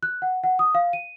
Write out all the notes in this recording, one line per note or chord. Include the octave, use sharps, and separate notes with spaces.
F#6
F#5
F#5
D#6
F5
D#7